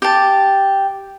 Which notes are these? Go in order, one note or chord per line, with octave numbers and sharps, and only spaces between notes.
G4 A5